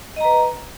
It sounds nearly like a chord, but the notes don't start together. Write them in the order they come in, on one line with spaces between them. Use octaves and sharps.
D#5 A#5 B4